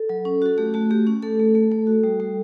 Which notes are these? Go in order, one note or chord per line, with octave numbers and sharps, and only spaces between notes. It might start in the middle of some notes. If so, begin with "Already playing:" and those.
Already playing: A4
F#3
C#4
F#4 A4
A3 G4
A3 F#4
A3 G4
C#4 G4
A3 A4
A3
A3
A3
F#4
G3
G3